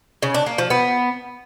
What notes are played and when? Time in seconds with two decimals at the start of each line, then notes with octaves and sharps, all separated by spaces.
0.22 C#3
0.34 D4
0.46 A#3
0.58 F3
0.70 B3